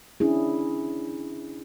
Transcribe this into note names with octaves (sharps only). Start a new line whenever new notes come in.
C#4 D4 E4 G#4